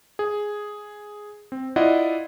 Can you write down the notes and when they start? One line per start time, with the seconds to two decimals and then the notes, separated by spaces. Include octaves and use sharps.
0.19 G#4
1.52 C4
1.76 E4 F4 D5 D#5 F#5